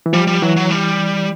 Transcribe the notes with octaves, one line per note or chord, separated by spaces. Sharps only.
E3
F3 G3
G3
E3 F#3
F#3
G3